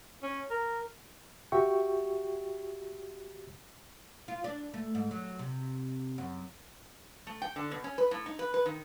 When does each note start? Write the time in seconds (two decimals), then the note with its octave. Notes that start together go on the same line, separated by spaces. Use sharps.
0.23 C#4
0.50 A#4
1.52 F#4 G4 E5 G5 C#6
4.28 F4
4.44 D4
4.74 A3
4.95 G#2
5.11 F#3
5.39 C3
6.18 F#2
7.27 A3
7.42 G5
7.56 D3
7.71 B2
7.84 C#4
7.98 B4
8.11 A2
8.26 D#4
8.39 B4
8.54 B4
8.66 D#3